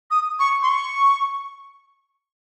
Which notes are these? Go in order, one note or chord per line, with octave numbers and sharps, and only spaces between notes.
D#6
C#6
C6
C#6